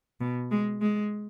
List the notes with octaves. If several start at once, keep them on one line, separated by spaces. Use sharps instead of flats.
B2
G#3
G#3